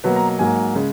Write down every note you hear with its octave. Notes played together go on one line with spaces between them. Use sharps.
B2 F#3 A#3 B4
A#5
A#5
G#2 F#3 A#3 G#5
C#3 G#3